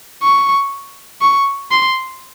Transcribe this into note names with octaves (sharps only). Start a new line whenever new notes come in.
C#6
C#6
C6